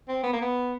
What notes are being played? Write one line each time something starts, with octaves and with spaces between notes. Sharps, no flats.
C4
B3
A#3
B3